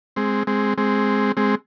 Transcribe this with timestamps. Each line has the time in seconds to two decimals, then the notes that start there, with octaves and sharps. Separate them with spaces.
0.16 G#3 C4
0.47 G#3 C4
0.78 G#3 C4
1.37 G#3 C4